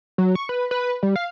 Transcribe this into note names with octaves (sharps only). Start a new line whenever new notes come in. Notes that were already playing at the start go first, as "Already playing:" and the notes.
F#3
C#6
B4
B4
G3
F5